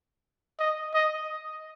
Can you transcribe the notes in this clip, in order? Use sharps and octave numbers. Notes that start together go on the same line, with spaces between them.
D#5
D#5